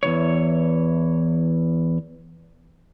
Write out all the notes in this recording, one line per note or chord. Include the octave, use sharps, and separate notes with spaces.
E2 B2 E3 C#5